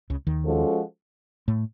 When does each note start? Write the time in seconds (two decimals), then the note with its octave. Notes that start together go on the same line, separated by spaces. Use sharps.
0.10 C#2 C#3
0.27 D#2 D#3
0.44 F3 G#3 C#4 F#4 A4
1.48 A2 A3